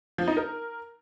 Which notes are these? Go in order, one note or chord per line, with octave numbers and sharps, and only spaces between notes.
F3
D#4
A#4